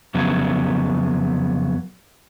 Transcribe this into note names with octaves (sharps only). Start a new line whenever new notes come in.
F2 C#3 F#3 B3